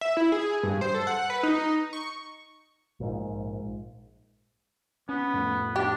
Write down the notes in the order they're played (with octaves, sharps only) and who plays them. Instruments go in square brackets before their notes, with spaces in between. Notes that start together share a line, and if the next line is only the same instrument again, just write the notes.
[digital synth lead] E5
E4
G#4
G2
C5
A4
F#5
B4
D#4
C#6
[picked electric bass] A#1 G#2
[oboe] B3 [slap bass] C#4
[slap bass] F2 A2
[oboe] D4 [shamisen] G4